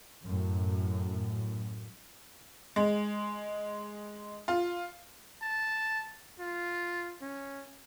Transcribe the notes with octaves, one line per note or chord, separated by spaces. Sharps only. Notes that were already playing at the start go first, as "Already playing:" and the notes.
F#2 A2
G#3
F4
A5
F4
C#4